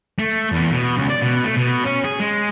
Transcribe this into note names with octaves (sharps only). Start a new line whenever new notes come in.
A3
E2
B2
C#2
D5
B2
A3
B2
C#4
G#4
G#3